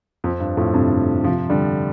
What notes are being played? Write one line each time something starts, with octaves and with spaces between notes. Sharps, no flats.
F2
G2
F2 A2
G2 C3
C3 F3
D3 G3